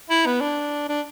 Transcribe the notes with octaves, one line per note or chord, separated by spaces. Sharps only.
E4
B3
D4
D4